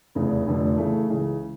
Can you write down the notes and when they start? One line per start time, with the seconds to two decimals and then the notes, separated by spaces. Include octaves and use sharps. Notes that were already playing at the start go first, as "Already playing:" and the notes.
0.15 F1 E2 C#3
0.47 F1 F2 D3 A3
0.77 C#3 E3 A3
1.09 C#2 C#3 E3